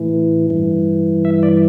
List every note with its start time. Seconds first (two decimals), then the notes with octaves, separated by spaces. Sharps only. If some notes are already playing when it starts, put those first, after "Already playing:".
Already playing: A2 E3
0.50 G2 E3
1.25 E5
1.43 D5